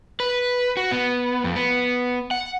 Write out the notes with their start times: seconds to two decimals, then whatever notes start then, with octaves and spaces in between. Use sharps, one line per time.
0.20 B4
0.77 F#4
0.91 B3
1.44 F2
1.56 B3
2.31 F#5